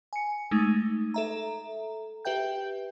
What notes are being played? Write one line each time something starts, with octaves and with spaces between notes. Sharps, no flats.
G#5 C#7
G#3 A3 D#4
A4 E5 A#5
G4 B4 E5 G5 G6